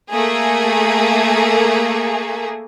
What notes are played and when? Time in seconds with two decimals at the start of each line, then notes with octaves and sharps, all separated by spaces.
0.11 A3 A#3 G#4